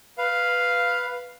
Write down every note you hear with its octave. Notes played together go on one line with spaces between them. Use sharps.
B4 F5